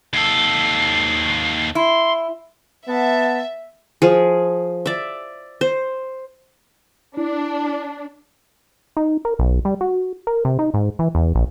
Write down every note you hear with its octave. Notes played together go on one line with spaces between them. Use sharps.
D#2 A4 C7
E4 C6
B3 E5 F#5 A5
F3 G#4
D5 E5
C5
D4 E4
D#4
A#4
B1
G3
F#4
A#4
C3
D#4
G#2
E3
E2
A#1